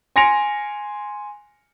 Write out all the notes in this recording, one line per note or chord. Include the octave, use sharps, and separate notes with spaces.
G#5 C6 A#6 C#7 D7 F7